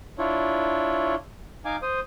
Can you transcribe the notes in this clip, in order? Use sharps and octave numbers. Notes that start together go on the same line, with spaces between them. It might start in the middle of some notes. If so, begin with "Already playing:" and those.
D4 E4 F4 C#5
D#4 F5 G#5 D6
C5 D#6